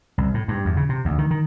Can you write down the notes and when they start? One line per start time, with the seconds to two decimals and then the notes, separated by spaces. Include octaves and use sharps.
0.18 C2
0.34 A2
0.48 G2
0.65 E2
0.77 C#3
0.89 C3
1.05 D2
1.18 D#3
1.31 D#3